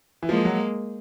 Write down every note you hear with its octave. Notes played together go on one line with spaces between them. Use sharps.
E3
F3 G#3 A#3
F#3